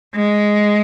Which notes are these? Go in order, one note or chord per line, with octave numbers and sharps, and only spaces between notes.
G#3